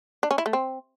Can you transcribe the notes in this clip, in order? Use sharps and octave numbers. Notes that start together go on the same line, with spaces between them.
D4
C#4
E4
A3
C4